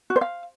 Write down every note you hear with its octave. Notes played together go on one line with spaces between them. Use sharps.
F#4
C5
F5